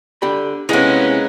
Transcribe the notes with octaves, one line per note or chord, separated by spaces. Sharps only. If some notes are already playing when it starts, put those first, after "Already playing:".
D3 G4 B5
C3 G#3 A#3 B3 C#4 D#4 E4